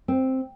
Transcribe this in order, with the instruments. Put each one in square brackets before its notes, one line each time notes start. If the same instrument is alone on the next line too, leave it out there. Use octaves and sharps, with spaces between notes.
[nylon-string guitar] C4